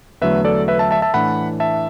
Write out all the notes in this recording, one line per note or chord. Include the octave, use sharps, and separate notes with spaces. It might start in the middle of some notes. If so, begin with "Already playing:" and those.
E2 D3 F#3 A3 B4 E5
A4 D5
B4 E5
E5 A5
E5 A5
E5 A5
A2 E3 D4 F#5 B5
E5 A5